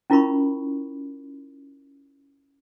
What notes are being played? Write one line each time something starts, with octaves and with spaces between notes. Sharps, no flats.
C#4 E4 F4 A#4 B5 C#6